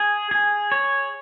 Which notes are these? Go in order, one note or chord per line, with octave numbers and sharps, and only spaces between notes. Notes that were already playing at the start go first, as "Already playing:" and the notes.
Already playing: G#4
G#4
C#5